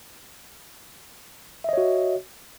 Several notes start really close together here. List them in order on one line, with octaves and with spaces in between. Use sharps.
E5 D#5 C#5 F#4